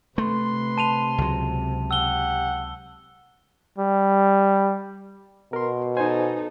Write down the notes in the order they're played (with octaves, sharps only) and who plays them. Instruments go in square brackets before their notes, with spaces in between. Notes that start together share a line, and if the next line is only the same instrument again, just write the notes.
[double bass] C3 [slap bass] A3 [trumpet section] B4 C6
[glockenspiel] A5 D#7 F7
[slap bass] C#2 F#3
[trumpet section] G4 F#5 [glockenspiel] E6 G7
[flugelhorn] G3
[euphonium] B2 [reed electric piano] A#4 C6
[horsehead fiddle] D#4 A4 [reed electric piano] C5 G#5